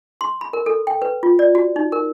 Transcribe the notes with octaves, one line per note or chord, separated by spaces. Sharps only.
C6
B5
A#4
A4
G5
B4
F4
D5
F#4
D#4
A#4